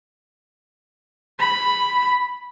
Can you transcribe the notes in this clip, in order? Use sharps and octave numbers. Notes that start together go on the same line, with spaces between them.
B5